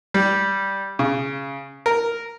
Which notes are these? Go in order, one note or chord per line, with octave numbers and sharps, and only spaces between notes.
G3
C#3
A#4